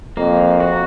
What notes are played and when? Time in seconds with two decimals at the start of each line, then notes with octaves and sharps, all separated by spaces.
0.17 F2 A#3
0.60 F#4